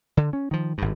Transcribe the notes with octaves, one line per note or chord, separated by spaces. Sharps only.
D3
C#4
D#3 F3
G#1 G2